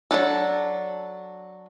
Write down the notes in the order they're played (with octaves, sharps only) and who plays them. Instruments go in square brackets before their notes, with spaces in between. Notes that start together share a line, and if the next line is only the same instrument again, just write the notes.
[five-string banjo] F#3 G#3 D4 A4